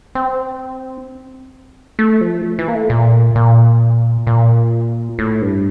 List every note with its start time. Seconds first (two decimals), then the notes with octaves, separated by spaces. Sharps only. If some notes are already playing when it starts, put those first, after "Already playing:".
0.15 C4
1.99 A3
2.21 F3
2.59 E3
2.68 A#3
2.75 A3
2.90 A#2
3.36 A#2
4.27 A#2
5.19 A2
5.41 G2